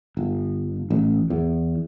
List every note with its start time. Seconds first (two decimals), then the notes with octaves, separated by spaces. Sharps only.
0.17 G1
0.90 A1
1.30 E2